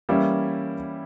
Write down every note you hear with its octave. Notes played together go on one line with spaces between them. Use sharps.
E3 G3 A#3 C#4 E4